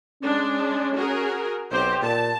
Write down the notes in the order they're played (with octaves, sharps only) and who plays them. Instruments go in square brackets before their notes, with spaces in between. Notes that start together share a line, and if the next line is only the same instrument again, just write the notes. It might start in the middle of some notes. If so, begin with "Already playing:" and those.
[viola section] G#3 D4 [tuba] C#4
[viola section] F#4 G#4 A#4
[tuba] B1 [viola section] C4 G4 C5
[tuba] A#2 [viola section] A5